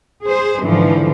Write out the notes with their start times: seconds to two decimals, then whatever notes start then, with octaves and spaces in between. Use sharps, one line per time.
0.24 G#4 C5
0.63 G#2 D3 E3 F3